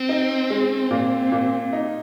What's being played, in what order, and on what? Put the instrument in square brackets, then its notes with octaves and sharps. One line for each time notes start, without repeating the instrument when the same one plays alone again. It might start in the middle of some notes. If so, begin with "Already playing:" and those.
Already playing: [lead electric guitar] C4
[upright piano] D#4
G#3
A#2
A#2
D#4